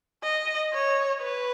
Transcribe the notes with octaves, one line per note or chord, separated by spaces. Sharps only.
D#5
C#5
B4